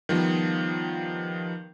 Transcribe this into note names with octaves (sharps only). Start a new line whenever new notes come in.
D#3 F3 G3 B3